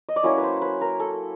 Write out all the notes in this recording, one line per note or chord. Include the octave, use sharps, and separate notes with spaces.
D#5
D5
F#3 A#3 C#4 E4 C#5
B4
C5
B4
A#4
A4